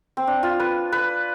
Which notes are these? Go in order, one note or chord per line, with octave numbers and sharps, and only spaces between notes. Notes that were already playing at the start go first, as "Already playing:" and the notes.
C4
D4
F4
B4
B4